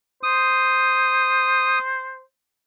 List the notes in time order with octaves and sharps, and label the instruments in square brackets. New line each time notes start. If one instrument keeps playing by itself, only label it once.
[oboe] C5 [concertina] D#6